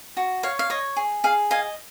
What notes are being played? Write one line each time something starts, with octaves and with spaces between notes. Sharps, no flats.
F#4
C#5 F5
F5
C#5 D#5
G#4
G#4 F5
D#5 F5 G#5